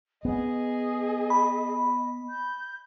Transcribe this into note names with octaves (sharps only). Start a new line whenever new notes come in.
B3 G#4 D#5
B5
G6